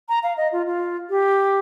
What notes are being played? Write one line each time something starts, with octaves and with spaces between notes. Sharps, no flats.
A#5
F5
D#5
F4
F4
G4